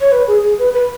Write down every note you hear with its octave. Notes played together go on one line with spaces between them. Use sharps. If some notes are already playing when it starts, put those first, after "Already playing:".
C#5
B4
G#4
G#4
B4
B4